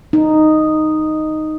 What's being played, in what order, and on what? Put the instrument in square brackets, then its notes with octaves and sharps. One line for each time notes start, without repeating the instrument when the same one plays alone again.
[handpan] D#4